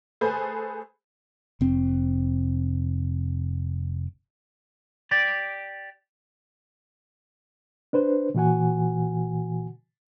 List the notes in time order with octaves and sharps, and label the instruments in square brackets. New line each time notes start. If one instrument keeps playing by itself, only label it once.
[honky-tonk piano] A3 G#4 A4 B4 C5 G#5
[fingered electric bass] F1 C4
[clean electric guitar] G4 D5
[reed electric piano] D4 B4 C5
A#2 E3 F#4 F#5 G#5